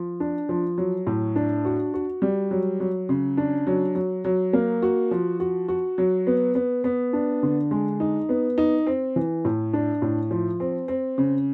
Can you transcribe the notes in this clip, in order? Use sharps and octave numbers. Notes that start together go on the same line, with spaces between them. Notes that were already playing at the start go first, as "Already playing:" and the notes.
Already playing: F3
D4
F3
F#3
A2
D4
F#4
F#4
G3
F#3
F#3
C#3
D4
F#3
F#3
F#3
A#3
F#4
F3
F#4
F#4
F#3
B3
B3
B3
D4
D3
G#3
D#4
B3
D#4
C4
E3
A2
D4
A2
F3
C4
C4
C#3